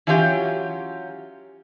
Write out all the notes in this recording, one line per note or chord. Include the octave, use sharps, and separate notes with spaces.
E3 F#3 C#4 F4 G4